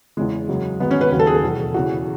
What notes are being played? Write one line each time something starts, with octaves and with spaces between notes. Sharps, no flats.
E2 C#3 E3 G#3
F#2 C#3 F#3
G#2 D#3 F#3 B3
C#4
B4
D#2 C#3 F#3 B4
A4
G#4
A4
E2 B2 F#3
E2 C#3 E3 F#4